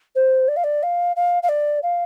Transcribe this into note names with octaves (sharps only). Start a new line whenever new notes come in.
C5
D5
F5
D5
F5
F5
F5
D5
F5